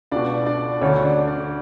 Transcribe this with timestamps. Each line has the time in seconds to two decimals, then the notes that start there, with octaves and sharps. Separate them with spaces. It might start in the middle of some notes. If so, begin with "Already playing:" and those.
0.11 C#2 B2 D4 D5
0.46 D4 D5
0.81 D2 D3 C#4 C#5
1.04 D4 D5
1.28 D4 D5